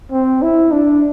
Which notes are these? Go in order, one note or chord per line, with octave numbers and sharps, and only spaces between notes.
C4
E4
D4